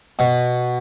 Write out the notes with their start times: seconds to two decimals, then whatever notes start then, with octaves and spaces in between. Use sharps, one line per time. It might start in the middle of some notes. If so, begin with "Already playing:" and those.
0.19 B2